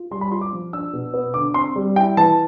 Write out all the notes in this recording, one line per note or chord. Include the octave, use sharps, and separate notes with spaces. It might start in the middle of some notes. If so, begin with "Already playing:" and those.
Already playing: F4
G3 C6
B5
F4 C6
D6
F3
D4 E6
B2
B3
D3 D6
C4 C6
G3
E4 G5
E3 A5